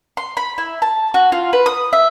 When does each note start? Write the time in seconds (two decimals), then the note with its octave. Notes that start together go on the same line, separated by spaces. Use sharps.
0.17 C6
0.37 B5
0.58 E4
0.82 A5
1.14 F#4
1.32 F4
1.53 B4
1.66 D#6
1.93 E5